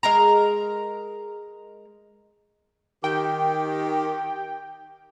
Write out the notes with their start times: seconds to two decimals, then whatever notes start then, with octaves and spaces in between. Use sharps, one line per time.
0.03 G#3 A#4 A#5
3.04 D#3 G4 G5